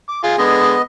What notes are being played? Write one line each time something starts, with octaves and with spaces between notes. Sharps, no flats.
D6
F4 G#4
D3 G#3 B3 D#5